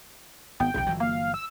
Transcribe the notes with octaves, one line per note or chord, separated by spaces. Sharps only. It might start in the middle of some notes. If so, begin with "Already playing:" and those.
G#1 B3 G5
D#1 B1 C3
G1 E3 F#3
A#3 F5
E6